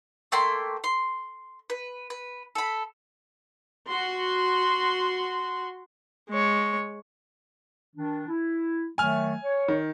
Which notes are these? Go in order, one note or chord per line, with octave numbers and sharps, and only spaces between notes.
A3 A#3 G5 C6
C6
B4
B4
A4 B5
F#4 C6
G#3 C#5
D#3 D4
E4
D#3 F#3 A3 G#5 F6
C#5
D#3